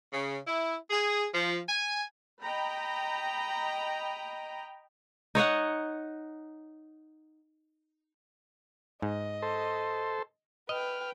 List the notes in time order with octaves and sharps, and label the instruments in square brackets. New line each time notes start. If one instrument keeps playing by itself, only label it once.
[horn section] C#3
E4
G#4
F3
G#5
[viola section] D#5 G5 A#5 B5
[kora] D#4 C#5 D#5 F#5
[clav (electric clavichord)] G#2 [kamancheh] D#5
[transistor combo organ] A4 C5
[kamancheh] B4 G5 [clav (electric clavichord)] D#5 [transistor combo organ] F6